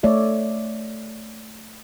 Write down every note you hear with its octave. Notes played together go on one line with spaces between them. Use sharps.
A3 C#5 D5 E5